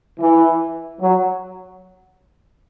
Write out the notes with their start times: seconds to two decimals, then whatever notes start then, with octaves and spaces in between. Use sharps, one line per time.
0.20 E3
1.01 F#3